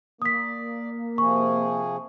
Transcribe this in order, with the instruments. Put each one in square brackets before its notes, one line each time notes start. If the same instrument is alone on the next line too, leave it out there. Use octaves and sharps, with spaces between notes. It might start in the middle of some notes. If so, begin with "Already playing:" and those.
[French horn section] A#3 [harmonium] D5 [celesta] D#6 B6
[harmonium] C3 F3 G#4 [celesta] C#6